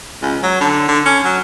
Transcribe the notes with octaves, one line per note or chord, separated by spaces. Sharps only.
C#2
F#3
D3
D3
C#4
F#3